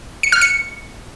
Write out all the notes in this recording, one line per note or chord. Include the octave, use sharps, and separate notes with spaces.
C#7
F6
C#7